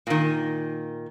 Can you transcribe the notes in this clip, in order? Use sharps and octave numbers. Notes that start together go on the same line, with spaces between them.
A#2 D#3